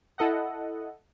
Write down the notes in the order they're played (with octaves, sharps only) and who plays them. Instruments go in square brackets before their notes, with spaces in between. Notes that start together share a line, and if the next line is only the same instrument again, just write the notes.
[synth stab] E4 A4 D#5 F#5